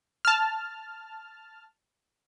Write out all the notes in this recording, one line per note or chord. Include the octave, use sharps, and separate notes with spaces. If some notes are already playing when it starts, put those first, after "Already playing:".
A5 F6